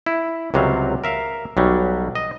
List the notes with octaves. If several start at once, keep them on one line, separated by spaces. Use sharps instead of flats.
E4
C#2 C3 F#3 G3 F5
A#4 E5 F5
B1 F#3 G3
D#5